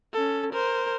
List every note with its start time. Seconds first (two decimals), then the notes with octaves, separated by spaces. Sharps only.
0.13 C#4 A4
0.52 A#4 C5